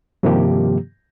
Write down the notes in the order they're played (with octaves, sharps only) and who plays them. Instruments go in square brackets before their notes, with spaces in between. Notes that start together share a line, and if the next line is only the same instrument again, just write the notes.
[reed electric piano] G2 C3 D#3 F3 A#3 G4